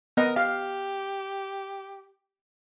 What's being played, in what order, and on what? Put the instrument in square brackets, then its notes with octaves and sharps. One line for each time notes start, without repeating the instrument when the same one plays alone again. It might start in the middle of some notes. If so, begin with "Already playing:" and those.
[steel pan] B3 D#5 [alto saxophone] A#4
[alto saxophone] G4 [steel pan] F5